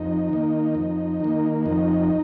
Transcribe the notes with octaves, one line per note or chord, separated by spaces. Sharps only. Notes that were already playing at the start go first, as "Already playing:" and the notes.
Already playing: F2 D#4
D#3 A#3
F2
D#3 A#3
F2 D#4